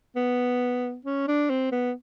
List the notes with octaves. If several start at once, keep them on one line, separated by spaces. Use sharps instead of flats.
B3
C#4
D4
C4
B3